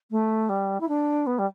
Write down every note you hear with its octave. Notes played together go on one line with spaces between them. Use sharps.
A3
G3
E4
D4
B3
G3